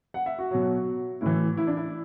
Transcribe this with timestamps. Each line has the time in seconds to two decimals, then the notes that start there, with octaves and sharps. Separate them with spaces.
0.14 F#5
0.26 E5
0.38 F#4
0.51 B2 F#3
1.21 A2 E3 E4
1.57 E4
1.67 D4
1.77 E4